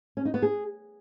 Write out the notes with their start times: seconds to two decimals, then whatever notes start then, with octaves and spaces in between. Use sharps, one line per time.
0.17 C#4
0.25 D#4
0.34 B3
0.42 G#4